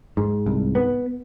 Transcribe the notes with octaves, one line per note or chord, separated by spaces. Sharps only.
G#2
C2
B3